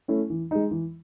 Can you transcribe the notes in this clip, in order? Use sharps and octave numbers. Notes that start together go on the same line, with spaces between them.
A3 C#4 E4
E3
G#3 D#4
E3